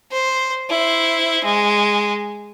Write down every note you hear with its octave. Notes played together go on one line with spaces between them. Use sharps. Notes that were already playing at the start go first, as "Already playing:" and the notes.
C5
E4 C5
G#3